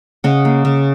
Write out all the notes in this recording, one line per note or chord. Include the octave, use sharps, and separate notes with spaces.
C#3 D#5 F#5
A#3
C#3